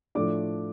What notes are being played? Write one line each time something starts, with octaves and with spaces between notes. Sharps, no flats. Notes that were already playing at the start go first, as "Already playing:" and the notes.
A2 F3 A3 D4 D6